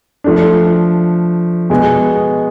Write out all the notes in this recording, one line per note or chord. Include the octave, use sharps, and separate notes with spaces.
F3 A3 D4
B2 G#3 B3